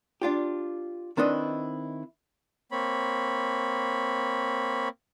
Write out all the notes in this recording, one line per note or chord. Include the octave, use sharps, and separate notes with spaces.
D4 F4 G4
D#3 C4 D4 E4 B4 D#5
A#3 C4 C#5 B5